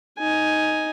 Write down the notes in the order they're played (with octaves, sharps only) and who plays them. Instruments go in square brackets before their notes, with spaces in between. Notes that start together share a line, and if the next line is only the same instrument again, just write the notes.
[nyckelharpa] D#4 G#5